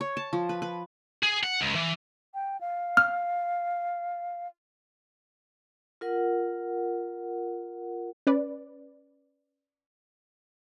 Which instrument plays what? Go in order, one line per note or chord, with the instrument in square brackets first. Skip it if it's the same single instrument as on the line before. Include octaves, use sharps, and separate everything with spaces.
[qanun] C#5
A5
F3
B4
B4
[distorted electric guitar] G#4
F#5
C#2
E3
[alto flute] G5
F5
[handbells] F6
[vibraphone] F4 A#4 F#5
[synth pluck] C#4 B4 D5